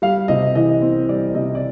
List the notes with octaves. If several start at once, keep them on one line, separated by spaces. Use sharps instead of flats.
G3 F5
C3 D#5
E3 D#5
C4
G3 D5
C3 D#5
D5